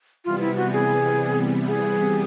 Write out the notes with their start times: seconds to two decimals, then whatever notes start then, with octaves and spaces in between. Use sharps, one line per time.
0.25 C3 E3 G3 B3 F4
0.41 E4
0.56 F#4
0.73 G#4
1.68 G#4